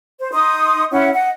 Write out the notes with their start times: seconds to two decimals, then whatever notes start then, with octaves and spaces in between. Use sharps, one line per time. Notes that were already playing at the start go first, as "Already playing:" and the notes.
0.20 C5
0.33 D#4 C6 D#6
0.92 C#4 E4 F#5
1.14 D#5 F#5